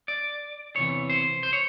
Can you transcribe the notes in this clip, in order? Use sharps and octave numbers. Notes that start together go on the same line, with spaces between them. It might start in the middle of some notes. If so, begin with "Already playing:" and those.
D5
E2 C3 E3 C#5
C5
C5
C#5